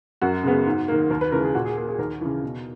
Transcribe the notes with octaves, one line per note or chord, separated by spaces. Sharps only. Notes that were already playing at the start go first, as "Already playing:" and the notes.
F#2 F#4
C#3 G#3 B3
G#2
D#3 A#3
D#2 A#4
B4
C#3 E3 G#3 A#4
G#4
A#2 F#4
G#4
A#3 G#4
G#4
D#2 A#4
C#3 E3
B2